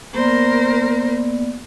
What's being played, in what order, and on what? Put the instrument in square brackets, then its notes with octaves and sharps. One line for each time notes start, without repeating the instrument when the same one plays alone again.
[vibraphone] A#3 B3 D5 [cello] A#4 C5